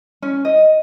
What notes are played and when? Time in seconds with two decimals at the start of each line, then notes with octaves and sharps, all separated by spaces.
0.22 C#4
0.45 D#5